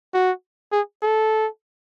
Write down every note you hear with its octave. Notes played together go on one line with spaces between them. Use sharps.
F#4
G#4
A4